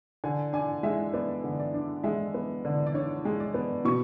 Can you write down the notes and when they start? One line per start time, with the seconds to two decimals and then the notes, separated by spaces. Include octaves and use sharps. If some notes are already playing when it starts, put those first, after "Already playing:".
0.24 D3 G#5
0.53 D4 G#5
0.83 G#3 E5
1.14 B3 D5
1.44 D3
1.60 D5
1.74 D4
2.04 G#3 E5
2.34 B3
2.65 D3
2.86 D5
2.94 D4 C#5
3.25 G#3
3.40 D5
3.54 B3
3.85 B2 C#6